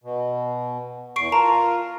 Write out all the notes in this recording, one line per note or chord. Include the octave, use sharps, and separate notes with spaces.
B2
E2 C#6 C7 D7
F4 A#4 A5 A#5